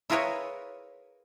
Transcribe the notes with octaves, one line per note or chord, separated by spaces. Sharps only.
E4 F4 G#4 A#4 B4 C#5